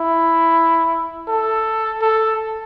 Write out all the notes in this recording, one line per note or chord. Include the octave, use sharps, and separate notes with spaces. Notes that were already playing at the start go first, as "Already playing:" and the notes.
Already playing: E4
A4
A4